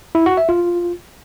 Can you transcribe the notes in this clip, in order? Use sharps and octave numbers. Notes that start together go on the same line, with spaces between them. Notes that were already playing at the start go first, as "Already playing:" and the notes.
E4
F#4
E5
F4